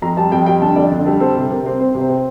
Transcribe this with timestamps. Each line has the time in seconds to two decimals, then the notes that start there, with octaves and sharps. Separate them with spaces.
0.02 F2 A#5
0.17 G3 A5
0.31 F2 G5
0.46 G3 G5
0.62 D3 A5
0.76 F2 D5
0.92 D3
1.06 G3 A4
1.20 C4 A4
1.36 C3
1.50 C3 A#4
1.66 C4
1.80 C4 C5
1.94 C3
2.00 C5
2.09 C4